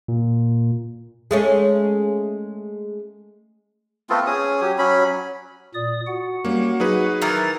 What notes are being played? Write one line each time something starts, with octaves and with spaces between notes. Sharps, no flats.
A#2
G#3 A3 C#4
A3 B3 C4 F4
C#4 G#4 D#6
F#3 G4
F#3 C#4 B5
A#2 D5 D#6
F#4 F#5
G3 A#3 C#4
F#3 D#4 G#4 B4
D#3 E3 A#4 A#5 A6